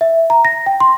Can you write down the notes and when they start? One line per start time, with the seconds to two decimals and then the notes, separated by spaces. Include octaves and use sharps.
0.01 E5
0.30 A#5
0.45 A#6
0.66 G5
0.80 C6